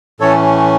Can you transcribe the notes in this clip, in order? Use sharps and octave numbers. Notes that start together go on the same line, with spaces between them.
A2 E3 A3 C#4 A4 C#5